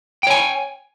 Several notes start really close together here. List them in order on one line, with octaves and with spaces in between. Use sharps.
G5 C#5 G#5